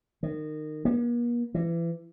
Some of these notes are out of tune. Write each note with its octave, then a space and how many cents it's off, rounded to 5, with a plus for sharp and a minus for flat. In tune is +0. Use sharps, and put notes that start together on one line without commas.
D#3 -25
A#3 +45
E3 +30